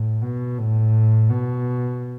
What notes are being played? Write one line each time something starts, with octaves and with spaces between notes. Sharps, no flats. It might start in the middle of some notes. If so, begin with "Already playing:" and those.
Already playing: A2
B2
A2
B2